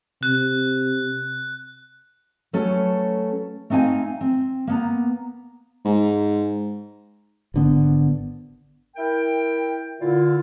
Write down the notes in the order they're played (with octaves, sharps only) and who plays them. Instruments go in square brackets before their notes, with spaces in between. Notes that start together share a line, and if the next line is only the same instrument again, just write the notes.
[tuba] C3 [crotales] F#6
[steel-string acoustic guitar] F#3 A3 C#4 A4 B4
A3 C4 D#4 F5 G#5
C4
A#3 B3 A#5
[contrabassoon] G#2
[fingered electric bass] G#1 D3 B3
[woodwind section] E4 A#4 G5
A#2 D3 E4 F4